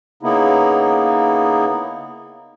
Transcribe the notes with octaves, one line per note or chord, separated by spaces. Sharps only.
C#3 A#3 B3 D#4 E4